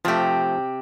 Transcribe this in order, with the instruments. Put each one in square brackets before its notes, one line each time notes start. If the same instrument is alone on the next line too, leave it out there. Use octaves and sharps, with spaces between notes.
[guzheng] C3 G4 [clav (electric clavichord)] F3 A3